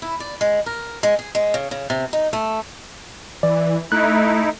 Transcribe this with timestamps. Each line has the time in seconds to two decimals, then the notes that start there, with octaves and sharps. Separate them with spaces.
0.02 E4
0.20 D5
0.41 G#3
0.66 A#4
1.03 G#3
1.19 G#4
1.35 G#3
1.54 C#3
1.71 C#3
1.90 C3
2.13 D#4
2.33 A3
3.43 E3 D5
3.92 A3 D#4 E4 F#6